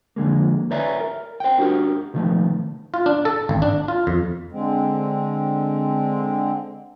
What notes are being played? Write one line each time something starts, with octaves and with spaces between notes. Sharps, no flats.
F2 D3 G#3 A#3
B4 C#5 D5 E5 G#5 A#5
A#4
C5 F#5 G5
D4 F#4 G4 A#4
B2 D#3 F3 A3
F4
D4
A4
G#1
D4
F4
F2
D3 G#3 C4